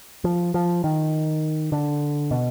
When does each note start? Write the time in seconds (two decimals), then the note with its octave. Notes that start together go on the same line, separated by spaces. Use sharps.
0.24 F3
0.54 F3
0.84 D#3
1.72 D3
2.31 B2